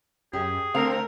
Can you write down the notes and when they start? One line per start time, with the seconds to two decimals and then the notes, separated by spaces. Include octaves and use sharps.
0.33 F#2 G4 G#4
0.74 D3 A3 C4 A#4 F5